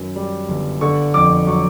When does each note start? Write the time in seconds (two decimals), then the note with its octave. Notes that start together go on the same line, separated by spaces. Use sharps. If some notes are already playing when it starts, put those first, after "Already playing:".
Already playing: F#2 D#3
0.16 G3
0.48 G1
0.81 D3 C#6
1.14 F2 D6
1.47 F#3 C#6